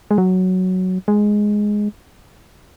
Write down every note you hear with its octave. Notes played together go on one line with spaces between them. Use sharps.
G#3
F#3
G#3